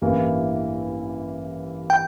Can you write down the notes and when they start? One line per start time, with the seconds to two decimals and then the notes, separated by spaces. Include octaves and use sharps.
0.02 A1 G2 E3 A#3 E4
1.90 G5